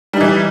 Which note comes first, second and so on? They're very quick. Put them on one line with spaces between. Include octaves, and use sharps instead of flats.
G3 D#4 E3